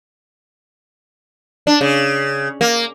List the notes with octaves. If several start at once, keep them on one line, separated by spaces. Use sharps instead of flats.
D4
C#3
A#3